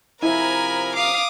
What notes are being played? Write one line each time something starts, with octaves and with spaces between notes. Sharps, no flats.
C3 F3 E4 A#4 G#5 A#5 B5
F5 D6 D#6